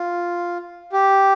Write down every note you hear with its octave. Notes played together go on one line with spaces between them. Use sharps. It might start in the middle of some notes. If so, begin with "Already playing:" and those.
Already playing: F4
G4